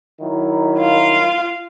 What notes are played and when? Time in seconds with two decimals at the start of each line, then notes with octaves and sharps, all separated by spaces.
0.21 D#3 F#3 E4
0.78 F4 F5